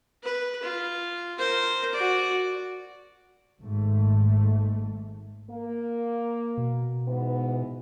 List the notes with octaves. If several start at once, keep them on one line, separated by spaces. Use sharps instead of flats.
B4
F4
A#4 C5
F#4 D5
G#1 G#2 A3
A#3
B2
G#2 E3 B3